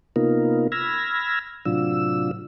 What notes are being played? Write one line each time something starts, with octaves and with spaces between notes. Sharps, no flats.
C3 A#3 B3 D#4 F4 A#4
B5 E6 F6 G#6 A#6
A2 C3 F#3 D4 F4 E6